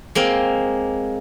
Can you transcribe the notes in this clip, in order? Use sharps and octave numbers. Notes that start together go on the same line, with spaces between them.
G#3 A#3 C4